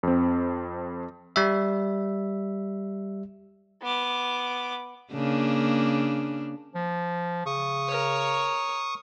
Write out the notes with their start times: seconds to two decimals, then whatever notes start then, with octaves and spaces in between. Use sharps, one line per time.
0.03 F2 C4
1.36 G3 E5
3.82 B3 D6
5.13 C#3 A#3 D4
6.75 F3
7.46 C#3 C#6 D#6
7.88 A#4 C#5